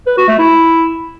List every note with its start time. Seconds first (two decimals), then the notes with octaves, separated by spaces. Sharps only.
0.07 B4
0.17 F#4
0.28 A3
0.39 E4